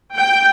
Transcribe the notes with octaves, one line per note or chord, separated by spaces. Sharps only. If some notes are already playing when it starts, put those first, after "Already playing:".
G5